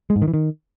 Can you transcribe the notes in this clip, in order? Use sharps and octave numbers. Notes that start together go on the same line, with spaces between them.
G#3
G#2
D#3
E3
D#3